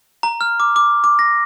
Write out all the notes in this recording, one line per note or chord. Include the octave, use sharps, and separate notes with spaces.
A#5
F6
D6
D6
D6
A#6